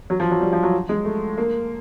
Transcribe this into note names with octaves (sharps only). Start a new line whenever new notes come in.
F#3
F3
F#3
G3
F3
F#3
G#3
A3
A#3